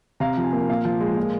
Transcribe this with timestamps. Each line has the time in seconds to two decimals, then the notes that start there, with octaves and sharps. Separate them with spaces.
0.20 C3 F5 A#5
0.37 F3
0.44 G#5
0.53 A#3
0.70 A#2 F5
0.85 F3
1.01 G#3
1.17 A#2